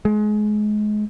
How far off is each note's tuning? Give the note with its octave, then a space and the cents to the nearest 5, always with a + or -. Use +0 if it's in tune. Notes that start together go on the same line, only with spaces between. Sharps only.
G#3 +25